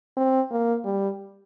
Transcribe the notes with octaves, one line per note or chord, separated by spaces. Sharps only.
C4
A#3
G3